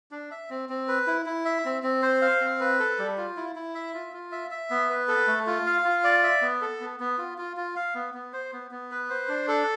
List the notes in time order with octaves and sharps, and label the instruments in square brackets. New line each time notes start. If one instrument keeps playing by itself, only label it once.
[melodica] D4
E5
C4
C4
B4
E4
E4
E5
C4
C4
C5
F5
C4
B4
A4
G3
F4
E4
E4
E5
F4
F4
E5
E5
B3
B4
A4
A3
F4
F5
F4
D5
E5
B3
A4
B3
B3
F4
F4
F4
F5
B3
B3
C5
B3
B3
B4
C5
D4
A4